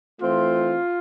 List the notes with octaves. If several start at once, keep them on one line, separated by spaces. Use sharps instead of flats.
E3 A3 C4 F4